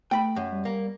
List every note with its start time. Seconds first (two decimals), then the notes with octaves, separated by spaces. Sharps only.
0.11 A3 G5 B5
0.36 F#2
0.52 G3
0.65 A#3